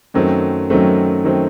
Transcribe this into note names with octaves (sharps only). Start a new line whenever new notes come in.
F#2 D#3 F#3 A3 C4
F#2 D#3 F#3 A3 C4
D#3 F#3 A3 C4